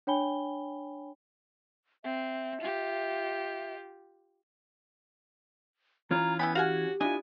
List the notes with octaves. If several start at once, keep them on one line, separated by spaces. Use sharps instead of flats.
D4 C#5 G5 G#5 B5 G7
C4 E5
F4 G4
E3 C#4 F4 A#5
B3 E4 G5 G#5 B5
F#4 G4 F5 F#5 G#5
D4 E4 F4 D#5 G#5